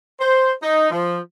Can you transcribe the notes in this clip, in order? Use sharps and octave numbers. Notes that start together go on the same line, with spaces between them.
C5
D#4
F3